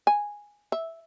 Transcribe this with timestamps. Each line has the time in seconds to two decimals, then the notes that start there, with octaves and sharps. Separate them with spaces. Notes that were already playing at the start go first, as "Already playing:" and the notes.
0.07 G#5
0.72 E5